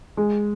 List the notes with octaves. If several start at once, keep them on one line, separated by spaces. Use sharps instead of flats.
G#3